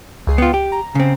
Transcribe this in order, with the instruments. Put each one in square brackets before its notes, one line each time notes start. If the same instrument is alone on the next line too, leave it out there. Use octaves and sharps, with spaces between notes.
[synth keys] C#2 G#4 C7
[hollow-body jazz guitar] B3 F4 [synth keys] G5
[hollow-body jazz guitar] G4
[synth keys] A#5
[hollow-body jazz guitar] C#3 C4